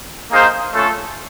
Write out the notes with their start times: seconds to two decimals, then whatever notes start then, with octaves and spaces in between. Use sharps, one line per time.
0.31 A#3 D#4 G#4 C5 F5
0.73 A3 C#4 F4 A4